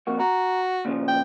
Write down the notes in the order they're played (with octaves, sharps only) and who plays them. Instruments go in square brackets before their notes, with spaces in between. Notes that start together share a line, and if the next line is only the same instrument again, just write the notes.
[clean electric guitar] F2 A#3 F#4
[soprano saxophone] F#4 [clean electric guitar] A#5
[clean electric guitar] A#2 C#3 F3
[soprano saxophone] G5